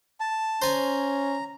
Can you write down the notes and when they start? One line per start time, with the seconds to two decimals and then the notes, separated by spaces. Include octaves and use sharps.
0.20 A5
0.62 C#4 C5 G#5 A#5